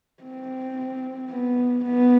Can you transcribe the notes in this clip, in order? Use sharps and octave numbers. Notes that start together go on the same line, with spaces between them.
C4
B3
B3